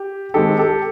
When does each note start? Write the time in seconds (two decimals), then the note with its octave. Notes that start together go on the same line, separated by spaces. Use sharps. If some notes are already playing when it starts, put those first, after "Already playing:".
Already playing: G4
0.34 D#3 G#3 C4 G4 A4
0.58 G4 A4